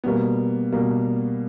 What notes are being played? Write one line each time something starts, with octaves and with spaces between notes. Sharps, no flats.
B2 G3 A#3 B3
B2 G3 A#3